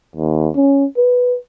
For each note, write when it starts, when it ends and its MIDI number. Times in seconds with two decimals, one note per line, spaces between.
0.16 0.49 39
0.56 0.85 61
0.98 1.37 71